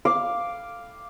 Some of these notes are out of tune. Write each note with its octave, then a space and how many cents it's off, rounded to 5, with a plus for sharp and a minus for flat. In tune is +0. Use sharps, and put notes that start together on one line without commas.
F5 +0 D6 +0